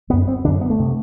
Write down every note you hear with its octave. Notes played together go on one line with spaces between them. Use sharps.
F#2 D3 B3
C4
F#2 D3 D4
B3
A3
C3